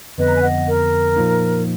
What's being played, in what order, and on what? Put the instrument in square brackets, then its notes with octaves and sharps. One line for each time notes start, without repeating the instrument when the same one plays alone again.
[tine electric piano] F2 D3 F3 B3 [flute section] B4 D#5
[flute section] A#5
G#5
D#5 F#5
A#4
[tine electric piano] A#2 F3 A#3 D#4